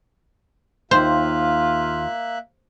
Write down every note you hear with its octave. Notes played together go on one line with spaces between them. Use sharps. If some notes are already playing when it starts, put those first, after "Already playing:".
D#2 A#3 F4 C5 E5 F#6